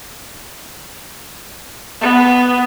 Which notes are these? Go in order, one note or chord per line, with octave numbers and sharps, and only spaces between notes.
B3